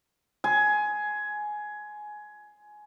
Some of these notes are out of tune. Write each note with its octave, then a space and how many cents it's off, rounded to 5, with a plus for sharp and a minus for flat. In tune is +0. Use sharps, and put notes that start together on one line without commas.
G#5 +15 C6 +0